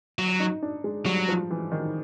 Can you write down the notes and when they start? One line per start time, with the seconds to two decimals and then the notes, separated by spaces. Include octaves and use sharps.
0.19 F#3
0.40 D#4
0.63 D4
0.84 G#3
1.05 F#3 G3
1.28 F3
1.51 E3
1.72 D#3